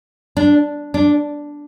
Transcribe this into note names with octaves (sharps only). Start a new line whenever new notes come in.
D4
D4